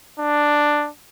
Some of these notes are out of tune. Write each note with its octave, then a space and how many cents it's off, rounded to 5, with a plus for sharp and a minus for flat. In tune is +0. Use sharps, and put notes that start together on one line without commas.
D4 +5